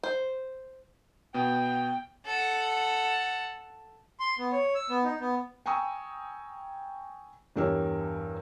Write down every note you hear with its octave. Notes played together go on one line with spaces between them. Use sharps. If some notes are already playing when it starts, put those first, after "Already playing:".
C5
B2 B3 G5
A4 F#5
C6
B3
C#5
E6
B3
D#4
B3
G5 G#5 A#5 C#6 D#6 E6
E2 G2 G4 A#4 C#5 E6